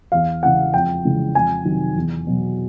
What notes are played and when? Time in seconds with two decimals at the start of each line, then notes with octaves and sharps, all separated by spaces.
0.12 E2 F5
0.43 C#3 E3 F#5
0.73 F2 G5
1.04 C#3 E3 G#3
1.34 F2 G#5
1.65 C3 D#3 F#3
1.96 E2
2.27 B2 F#3